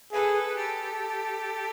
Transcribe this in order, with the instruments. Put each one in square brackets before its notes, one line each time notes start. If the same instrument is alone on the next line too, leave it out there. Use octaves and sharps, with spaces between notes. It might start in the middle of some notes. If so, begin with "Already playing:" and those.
[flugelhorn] G#4 [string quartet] A4 B4
[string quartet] G4 A4